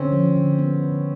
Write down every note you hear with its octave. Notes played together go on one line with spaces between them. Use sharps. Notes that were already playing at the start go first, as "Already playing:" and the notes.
Already playing: D3 C4 C#4
F3
D3
B3
D3